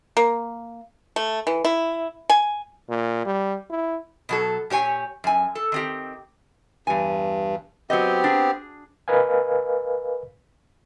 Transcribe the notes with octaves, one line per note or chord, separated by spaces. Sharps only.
A#3
A3
E3
E4
G#5
A#2
G3
E4
B2 F#3 A4
A#2 G4 C#5 G#5
F#2 G#5
A4
D#3 C4 G4
E2 G2 G#5
F#3 B3 C4 G4 D#5
D4 G#4
A#4 B4 D#5 F5 G#5